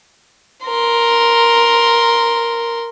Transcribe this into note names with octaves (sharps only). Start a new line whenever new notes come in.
A#4 C6